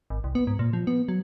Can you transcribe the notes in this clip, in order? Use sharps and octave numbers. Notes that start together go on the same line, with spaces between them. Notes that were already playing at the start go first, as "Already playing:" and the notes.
G#1
C2
B3
G#2
A#2
F3
B3
F#3